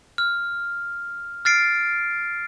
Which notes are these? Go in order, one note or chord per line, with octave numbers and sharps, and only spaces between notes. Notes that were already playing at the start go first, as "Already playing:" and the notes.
F6
F6 A6 C7 D7